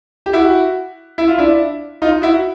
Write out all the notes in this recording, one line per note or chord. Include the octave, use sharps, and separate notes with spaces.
G4
E4 F#4
E4
F4
D4 E4
D#4 F4
E4 F#4